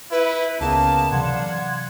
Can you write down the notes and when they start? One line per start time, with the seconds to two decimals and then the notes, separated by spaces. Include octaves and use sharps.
0.11 E4 B4
0.61 C#2 C#3 A#3 B3 A5
1.12 C3 E3 F#3 D5 F5 F#5 C6 G#6